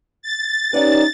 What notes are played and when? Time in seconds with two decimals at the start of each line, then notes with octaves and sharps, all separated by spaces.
0.22 A6
0.73 C#4 D#4 G4 B4 D5 F#5